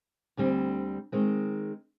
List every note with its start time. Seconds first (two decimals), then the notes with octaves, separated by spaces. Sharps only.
0.37 D2 D3 G3 C4
1.12 D#3 G#3 C4